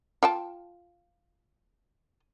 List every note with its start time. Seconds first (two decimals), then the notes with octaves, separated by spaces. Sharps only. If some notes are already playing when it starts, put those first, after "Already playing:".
0.23 F4 G5 A5